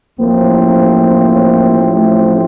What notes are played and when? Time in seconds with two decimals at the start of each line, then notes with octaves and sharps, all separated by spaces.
0.18 A1 A2 F3 A#3 C4
1.95 A3